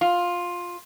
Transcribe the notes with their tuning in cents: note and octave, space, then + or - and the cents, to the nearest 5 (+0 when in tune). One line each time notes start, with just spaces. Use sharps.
F4 +10